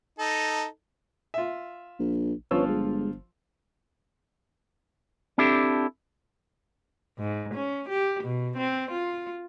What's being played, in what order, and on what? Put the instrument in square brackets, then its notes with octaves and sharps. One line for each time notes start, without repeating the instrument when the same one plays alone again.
[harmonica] D#4 A4
[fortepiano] F4 E5
[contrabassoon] A#1
[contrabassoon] G1 [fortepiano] F3 F4 E6 [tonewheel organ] C#4 B4 C#5
[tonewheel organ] G#3
[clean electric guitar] C4 D4 E4 G4 A4
[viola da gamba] G#2
C#4
G4
B2
C4
F4